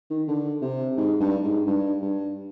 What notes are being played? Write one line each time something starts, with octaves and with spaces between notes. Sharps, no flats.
D#3
D3
C3
G#2
G2
G#2
G2
G2